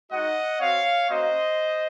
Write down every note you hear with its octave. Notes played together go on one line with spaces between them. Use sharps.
G#3 D#4 F#4 D#5 F#5
C4 F#4 C#5 F5
A#3 C#4 F#4 C5 D#5